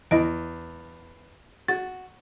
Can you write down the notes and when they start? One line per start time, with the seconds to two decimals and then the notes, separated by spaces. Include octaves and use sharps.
0.11 E2 E4 D#5 D7
1.68 F#4 A6